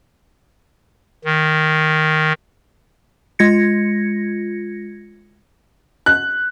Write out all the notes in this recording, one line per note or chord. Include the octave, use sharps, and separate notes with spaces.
D#3
G#3 F4 G#6 A#6 C#7
F#6